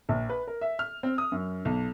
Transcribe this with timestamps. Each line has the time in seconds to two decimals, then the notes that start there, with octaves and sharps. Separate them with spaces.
0.09 A#1
0.29 B4
0.47 A#4
0.61 E5
0.79 F6
1.03 C4
1.18 D#6
1.32 F#2
1.65 B1